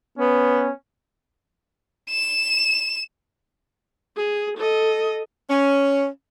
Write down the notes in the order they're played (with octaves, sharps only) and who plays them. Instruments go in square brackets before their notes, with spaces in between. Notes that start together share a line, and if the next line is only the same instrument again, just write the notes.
[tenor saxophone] B3 [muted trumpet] C#4
[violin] E7
[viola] G#4
A4 D#5
[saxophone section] C#4